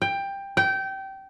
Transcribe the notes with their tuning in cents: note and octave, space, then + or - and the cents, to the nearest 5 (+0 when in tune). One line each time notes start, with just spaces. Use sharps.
G5 +15
G5 -20